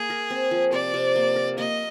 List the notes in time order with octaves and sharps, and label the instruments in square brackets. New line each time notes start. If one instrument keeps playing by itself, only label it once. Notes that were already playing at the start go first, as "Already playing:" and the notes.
Already playing: [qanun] A#3 [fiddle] G#4
[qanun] A#4
C4
F3
[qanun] C3 [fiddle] D5
[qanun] C3
A#3
A#4
[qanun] A#3 [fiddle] D#5